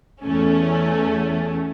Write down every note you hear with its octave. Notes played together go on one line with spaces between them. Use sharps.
E2 A3 C#4